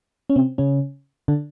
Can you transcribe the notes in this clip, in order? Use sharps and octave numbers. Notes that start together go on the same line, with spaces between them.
C#4
C3 C4
C#3 C#4
D3 D4